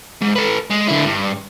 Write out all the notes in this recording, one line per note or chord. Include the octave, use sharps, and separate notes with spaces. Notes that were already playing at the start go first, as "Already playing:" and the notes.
G#2
A4 B4
G#3
D3 E4
G2